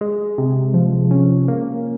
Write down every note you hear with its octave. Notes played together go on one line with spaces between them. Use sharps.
G#3
C3
F3
C#4
A#3